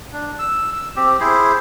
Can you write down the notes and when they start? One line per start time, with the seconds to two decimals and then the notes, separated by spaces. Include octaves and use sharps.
0.13 D4
0.39 E6
0.73 E6
0.96 C4 G4
1.20 E4 G#4 C5